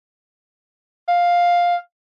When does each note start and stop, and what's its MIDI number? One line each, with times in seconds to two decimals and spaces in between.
1.08 1.75 77